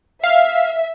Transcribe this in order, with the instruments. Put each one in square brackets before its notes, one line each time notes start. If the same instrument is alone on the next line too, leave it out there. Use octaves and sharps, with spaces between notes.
[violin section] E5 [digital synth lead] F5